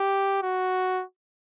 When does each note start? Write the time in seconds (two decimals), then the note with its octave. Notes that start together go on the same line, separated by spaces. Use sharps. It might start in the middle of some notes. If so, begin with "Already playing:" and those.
Already playing: G4
0.43 F#4